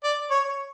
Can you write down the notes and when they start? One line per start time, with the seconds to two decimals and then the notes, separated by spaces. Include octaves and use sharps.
0.04 D5
0.31 C#5